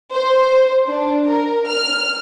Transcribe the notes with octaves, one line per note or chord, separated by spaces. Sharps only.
C5
D4
A#4
F6